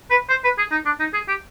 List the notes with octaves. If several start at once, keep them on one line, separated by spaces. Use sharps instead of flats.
B4
C5
B4
G#4
D#4
D4
D#4
G#4
G4